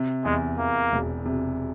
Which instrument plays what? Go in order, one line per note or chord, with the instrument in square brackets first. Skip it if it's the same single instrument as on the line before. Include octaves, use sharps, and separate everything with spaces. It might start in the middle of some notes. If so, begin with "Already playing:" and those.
Already playing: [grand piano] C3
[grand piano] E2 [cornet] G#3
[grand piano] E2 [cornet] A#3
[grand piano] E1
C3